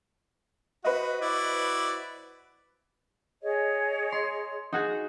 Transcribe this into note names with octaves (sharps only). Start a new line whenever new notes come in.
F#4 B4 C5 D#5
E4 F#4 D5
G#4 C#5 D#5
C6
D#4 F#4 G#4